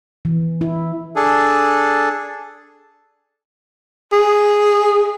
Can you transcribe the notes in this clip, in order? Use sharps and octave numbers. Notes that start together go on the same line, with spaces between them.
E3
E4
D4 G#4 A4
G#4